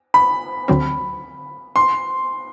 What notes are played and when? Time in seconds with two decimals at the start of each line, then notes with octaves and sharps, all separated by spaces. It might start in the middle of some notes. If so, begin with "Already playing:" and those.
0.14 B5
0.68 D2 D3 F#3 C4
1.76 C6